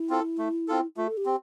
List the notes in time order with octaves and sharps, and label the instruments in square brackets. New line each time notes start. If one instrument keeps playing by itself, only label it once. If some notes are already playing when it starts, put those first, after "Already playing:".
Already playing: [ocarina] E4
[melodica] C4 F4 A4
A3
C4 F4 A4
[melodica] A3 [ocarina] F4
[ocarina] A4
G4
[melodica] C4